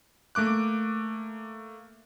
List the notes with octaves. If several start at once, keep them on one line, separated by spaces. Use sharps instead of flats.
A3 A#3 D6 F#6